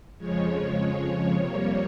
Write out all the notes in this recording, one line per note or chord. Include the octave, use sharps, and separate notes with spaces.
F2 C#3 F3 G#3 C#5
F2 C3 G3 A#3